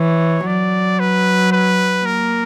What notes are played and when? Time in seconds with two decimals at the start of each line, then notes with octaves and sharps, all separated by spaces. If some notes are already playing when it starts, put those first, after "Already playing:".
Already playing: E3 C#5
0.46 F#3 D5
1.00 B4
1.52 B4
2.05 A#3 A#4